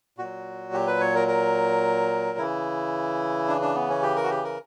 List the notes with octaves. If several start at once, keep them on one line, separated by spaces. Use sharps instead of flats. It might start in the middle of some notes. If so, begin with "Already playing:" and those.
A#2 F#3 F#4
G4
B4
C#5
A#4
A#4
C#3 E3 E4
D4
D4
B3
C#4
G4
A#4
F#4
G4
A#4